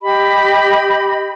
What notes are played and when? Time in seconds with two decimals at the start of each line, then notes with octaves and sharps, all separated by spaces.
0.01 G4 D#5 B5